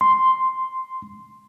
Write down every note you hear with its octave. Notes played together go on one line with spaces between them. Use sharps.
C6